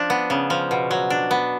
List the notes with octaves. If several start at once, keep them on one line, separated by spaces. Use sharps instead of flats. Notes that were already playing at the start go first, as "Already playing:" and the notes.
Already playing: F3 D4
B3
C#3
F3
B2
F#3
D4
B3